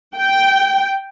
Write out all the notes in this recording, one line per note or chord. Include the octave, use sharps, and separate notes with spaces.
G5